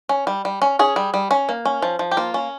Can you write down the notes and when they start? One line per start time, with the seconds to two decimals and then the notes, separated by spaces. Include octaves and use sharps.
0.09 C#4
0.27 G3
0.45 G3
0.62 C#4
0.79 C#4 G#4
0.96 G3
1.14 G3
1.31 C#4
1.49 A#3
1.65 C#4
1.82 F3
1.99 F3
2.11 G4
2.17 A#3 F4
2.34 C#4